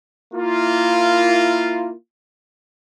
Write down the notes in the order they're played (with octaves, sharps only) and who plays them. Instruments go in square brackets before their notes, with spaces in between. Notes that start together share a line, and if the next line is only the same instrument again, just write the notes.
[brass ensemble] A#3 E4 F4